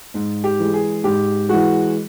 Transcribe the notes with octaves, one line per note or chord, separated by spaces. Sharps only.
G#2
G4
E3 G#3
G#4
G#2 G4
E3 G#3 F#4